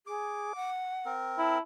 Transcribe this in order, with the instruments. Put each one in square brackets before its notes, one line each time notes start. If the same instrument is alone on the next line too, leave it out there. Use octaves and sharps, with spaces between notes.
[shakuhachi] G#4 [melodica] D6
[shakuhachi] F#5
[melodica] C4 A#4
[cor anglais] E4 [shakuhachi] A5